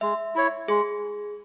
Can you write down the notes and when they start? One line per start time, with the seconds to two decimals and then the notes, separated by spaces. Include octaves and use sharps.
0.01 G#3 E5
0.35 E4 C#5
0.68 G#3 G#4